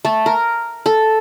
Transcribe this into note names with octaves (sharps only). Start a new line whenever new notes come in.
A3 A4
A#4
A4